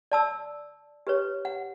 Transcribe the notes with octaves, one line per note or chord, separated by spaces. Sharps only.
D5 A5 E6
G4 B4 C#5
F#5